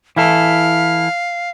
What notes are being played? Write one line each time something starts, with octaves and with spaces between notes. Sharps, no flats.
E3 E4 A4 F5